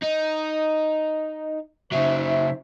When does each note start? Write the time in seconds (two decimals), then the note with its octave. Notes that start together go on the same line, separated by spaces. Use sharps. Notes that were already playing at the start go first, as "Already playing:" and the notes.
0.03 D#4
1.91 C#3 F#3 D#4 C5 E5